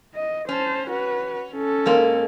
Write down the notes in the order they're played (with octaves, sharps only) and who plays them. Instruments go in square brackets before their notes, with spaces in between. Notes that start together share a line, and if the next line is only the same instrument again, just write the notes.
[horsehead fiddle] D#5
[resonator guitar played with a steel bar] C#4 [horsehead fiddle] C5 A5
[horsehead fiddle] F#4 B4
C#4 A4
[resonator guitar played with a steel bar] G#2 G#3 A#3